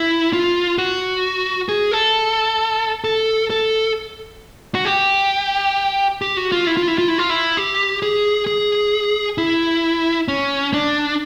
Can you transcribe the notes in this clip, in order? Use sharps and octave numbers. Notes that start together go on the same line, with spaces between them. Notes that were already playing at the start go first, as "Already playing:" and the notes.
Already playing: E4
F4
F#4
G#4
A4
A4
A4
F#4
G4
G4
F#4
F4
E4
F4
E4
F4
E4
F4
E4
G4
G#4
G#4
E4
C#4
D4